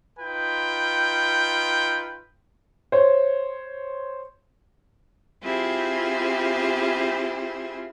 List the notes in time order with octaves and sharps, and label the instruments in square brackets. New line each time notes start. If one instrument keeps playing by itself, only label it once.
[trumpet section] D#4 F4 B4 G5
[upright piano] C5 C#5
[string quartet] C4 E4 F4 G4 G#4 C5